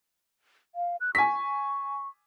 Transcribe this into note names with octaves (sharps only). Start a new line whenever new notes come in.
F5
F#6
G#5 C#6 B6